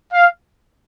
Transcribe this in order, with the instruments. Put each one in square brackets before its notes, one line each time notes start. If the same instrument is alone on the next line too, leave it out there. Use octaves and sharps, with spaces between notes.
[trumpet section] F5